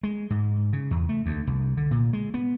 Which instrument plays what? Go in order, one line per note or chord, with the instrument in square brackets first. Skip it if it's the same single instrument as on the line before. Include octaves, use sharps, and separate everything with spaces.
[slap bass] G#3
G#2
C#3
E2
A3
D2
C2
D3
A#2
G#3
B3